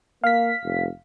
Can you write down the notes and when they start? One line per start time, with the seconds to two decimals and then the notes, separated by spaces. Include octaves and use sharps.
0.24 A#3 F5 B6
0.64 F1